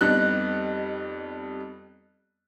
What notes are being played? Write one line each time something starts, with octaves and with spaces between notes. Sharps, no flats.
F2 G3 B3 D#4 F#6